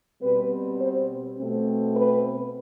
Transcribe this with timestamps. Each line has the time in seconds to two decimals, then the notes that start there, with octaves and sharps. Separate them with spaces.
0.22 B2 G3 C4 B4
0.79 C5
1.37 B2 A3 C4
1.95 B4